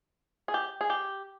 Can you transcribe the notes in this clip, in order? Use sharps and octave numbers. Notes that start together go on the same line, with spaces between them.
G#4
G4
G#4
G4